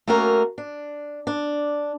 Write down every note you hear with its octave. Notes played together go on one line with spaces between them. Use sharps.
A3 A#3 C#4 F#4 A#4
D4
D4